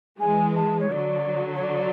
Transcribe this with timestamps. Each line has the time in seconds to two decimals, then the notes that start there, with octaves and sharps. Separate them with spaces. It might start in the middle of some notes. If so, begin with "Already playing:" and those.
0.20 E3 G#3 G#5
0.55 A5
0.79 C#5
0.91 D3 F#3 D5
1.54 C#5
1.63 D5